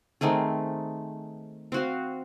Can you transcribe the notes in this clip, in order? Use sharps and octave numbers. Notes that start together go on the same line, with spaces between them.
D#3 A3 C4 G#4
C4 F#4 F5